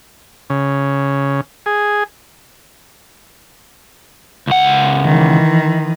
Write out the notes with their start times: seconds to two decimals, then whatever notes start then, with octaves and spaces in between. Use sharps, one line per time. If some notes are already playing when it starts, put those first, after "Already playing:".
0.50 C#3
1.66 G#4
4.47 C#2 F#5
5.04 D#3 E3